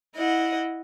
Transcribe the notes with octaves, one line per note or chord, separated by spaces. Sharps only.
E4 D#5 F#5